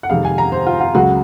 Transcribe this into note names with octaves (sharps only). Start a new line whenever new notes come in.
F#5
F2 C3 D#3 G#3 F5
G#5
A#5
C5
F4
F4
C#2 C#3 F#3 F#4